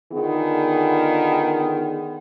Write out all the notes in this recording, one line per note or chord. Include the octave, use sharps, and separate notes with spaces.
D3 D#3 B3 F4 G#4